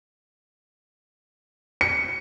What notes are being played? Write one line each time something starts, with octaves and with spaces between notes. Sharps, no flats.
C#7